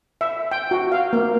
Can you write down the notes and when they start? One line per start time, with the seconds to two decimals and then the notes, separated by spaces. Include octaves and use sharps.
0.21 E5
0.52 G5
0.71 F#4
0.92 F5
1.13 A#3